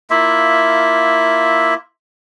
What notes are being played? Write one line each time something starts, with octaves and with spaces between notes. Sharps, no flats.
A#3 E4 F4 E5